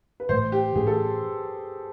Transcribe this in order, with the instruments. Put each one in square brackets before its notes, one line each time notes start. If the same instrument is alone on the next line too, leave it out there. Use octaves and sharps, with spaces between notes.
[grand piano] B4
[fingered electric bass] A2 E3 A3 [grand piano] C5
[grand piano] G4
[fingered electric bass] A2 E3 A3 C#4 [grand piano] G#4
[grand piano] A4